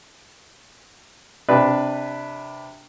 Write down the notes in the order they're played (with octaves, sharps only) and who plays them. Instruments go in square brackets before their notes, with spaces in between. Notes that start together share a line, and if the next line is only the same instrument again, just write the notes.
[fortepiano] C3 D4 B4